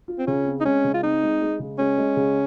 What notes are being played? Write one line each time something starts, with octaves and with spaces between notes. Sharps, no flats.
F4
C4
C#3 C#4
C4
D#4
G#3 C#4
C#3
F4
C4 D#4
G#3
G#3
C#3
G#3 C#4
G#3
C#3